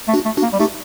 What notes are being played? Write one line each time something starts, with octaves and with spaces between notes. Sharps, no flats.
A3
D4 F#4
A3
D4 F#4
A#3
G3
A3 D#4 G4